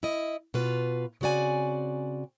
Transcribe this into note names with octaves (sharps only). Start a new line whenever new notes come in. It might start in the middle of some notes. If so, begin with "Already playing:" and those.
E4 D#5
B2 F4 B4
C#3 C4 F#4 D5 G#5